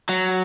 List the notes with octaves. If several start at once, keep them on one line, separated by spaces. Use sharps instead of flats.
F#3